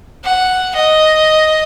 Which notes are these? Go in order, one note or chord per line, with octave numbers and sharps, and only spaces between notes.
F#5
D#5